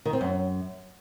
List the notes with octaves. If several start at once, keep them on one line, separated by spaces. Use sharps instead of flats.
D#3
C4
F#2